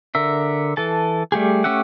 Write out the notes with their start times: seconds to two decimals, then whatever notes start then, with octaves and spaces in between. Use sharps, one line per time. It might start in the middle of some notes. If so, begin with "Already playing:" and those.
0.15 D3 A#4 E5
0.77 E3 A4 A5
1.32 G3 A3 G4 G#4
1.64 A3 C#4 G4 E5 F#5